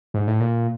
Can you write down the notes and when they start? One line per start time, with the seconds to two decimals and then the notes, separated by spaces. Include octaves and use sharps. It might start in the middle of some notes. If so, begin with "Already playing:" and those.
0.14 G#2
0.27 A2
0.40 A#2